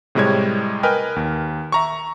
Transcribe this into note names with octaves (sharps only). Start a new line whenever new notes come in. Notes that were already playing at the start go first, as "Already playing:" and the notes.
A2 C3 G3 G#3 C#5 G#6
A#4 B4 D#5 G5 G#5 F6
D#2
E5 A#5 C#6